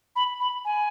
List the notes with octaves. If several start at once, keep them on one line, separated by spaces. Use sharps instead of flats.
B5
B5
G#5